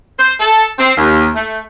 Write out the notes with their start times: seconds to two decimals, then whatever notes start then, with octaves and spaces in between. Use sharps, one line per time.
0.19 C5
0.39 A4
0.79 C4
0.97 D#2
1.35 A3